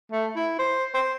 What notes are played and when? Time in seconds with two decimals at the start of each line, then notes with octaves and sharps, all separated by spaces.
0.12 A3
0.36 E4
0.59 C5
0.94 C5